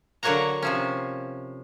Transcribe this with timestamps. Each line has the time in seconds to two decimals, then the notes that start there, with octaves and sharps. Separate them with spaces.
0.23 D3 F#3 A#3 C#5 F#5 A#5
0.62 C3 F3 C#4